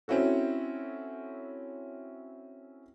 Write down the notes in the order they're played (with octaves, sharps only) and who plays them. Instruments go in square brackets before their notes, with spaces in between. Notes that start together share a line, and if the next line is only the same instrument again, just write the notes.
[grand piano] C4 C#4 E4 F#4 A4